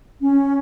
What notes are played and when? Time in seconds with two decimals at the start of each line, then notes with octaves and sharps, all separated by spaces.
0.21 C#4